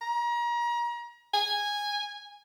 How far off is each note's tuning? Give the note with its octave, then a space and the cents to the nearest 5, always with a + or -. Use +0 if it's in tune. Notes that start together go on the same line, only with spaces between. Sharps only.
A#5 +35
G#5 -10